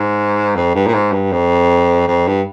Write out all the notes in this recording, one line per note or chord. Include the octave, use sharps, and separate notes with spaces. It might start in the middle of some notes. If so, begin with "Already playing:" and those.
Already playing: G#2
F2
G2
A#2
G#2
G2
F2
F2
G2